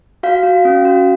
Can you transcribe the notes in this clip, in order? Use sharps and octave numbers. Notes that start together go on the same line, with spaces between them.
F#4 F5
F#4
C#4
F#4